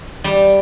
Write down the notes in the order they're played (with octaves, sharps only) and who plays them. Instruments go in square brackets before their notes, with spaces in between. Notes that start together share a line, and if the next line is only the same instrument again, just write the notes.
[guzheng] G3